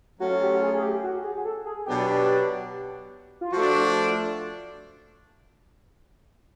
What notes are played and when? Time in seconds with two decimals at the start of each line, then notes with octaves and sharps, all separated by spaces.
0.20 F#3 A3 C#4 F4 F#4
0.42 G4
0.63 G#4
0.76 G#4
0.83 G4
1.04 F#4
1.24 G#4
1.45 A4
1.66 G#4
1.86 B2 F#3 B3 D4 G4
3.41 F4
3.52 F3 A3 D4 F#4